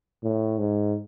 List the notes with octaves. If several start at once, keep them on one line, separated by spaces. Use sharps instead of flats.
A2
G#2